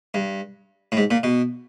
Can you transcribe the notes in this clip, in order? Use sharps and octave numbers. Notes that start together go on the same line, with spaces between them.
G2
A2
G#2
A#2
B2